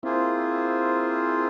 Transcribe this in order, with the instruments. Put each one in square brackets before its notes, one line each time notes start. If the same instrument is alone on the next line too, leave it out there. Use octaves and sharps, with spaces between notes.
[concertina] A#3 F4 G#4 C5 [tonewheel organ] C4 E4